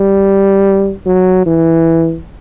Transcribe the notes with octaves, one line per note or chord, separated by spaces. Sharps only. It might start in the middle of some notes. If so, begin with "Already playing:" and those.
Already playing: G3
F#3
E3